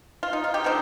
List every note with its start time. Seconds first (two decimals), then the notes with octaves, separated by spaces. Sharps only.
0.23 F4
0.33 D#4
0.44 F4
0.54 D#4 G4
0.64 D3 F3 C4 D#4